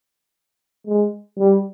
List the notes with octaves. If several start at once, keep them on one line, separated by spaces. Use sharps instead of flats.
G#3
G3